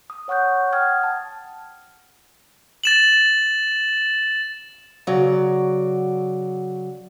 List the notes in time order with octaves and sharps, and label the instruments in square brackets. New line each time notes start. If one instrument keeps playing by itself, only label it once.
[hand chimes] D#6
C#5 F#5 C#6 F#6 G6
F#5 G5 D#6 F6 G#6
A5
[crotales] A6 E7 F#7
[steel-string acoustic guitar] C#3 F#3 D5